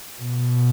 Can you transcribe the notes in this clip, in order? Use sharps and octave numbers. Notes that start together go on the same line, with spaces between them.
B2